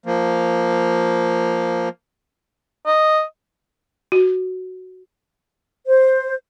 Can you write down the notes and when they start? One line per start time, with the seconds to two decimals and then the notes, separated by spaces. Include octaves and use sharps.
0.06 F3 A#3
2.86 D#5
4.12 F#4
5.87 C5